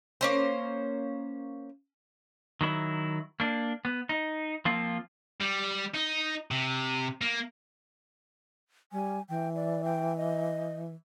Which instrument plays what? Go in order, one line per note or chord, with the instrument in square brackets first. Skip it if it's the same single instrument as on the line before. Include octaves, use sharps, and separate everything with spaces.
[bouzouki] A#3 C#4 C5
[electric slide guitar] D#3 F#3 E4
A#3 D4
B3
D#4
F3 A#3 C4 F4
[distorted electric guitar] G3
D#4
C3
A#3
[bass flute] G3 [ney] G#5
[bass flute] E3 [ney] G5
[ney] D5
G5
D#5